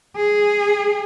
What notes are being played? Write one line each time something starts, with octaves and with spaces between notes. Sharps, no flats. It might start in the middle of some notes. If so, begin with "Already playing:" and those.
G#4